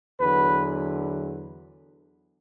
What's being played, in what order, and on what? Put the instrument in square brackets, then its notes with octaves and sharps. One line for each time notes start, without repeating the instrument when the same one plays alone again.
[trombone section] E2 D3 F#3 B4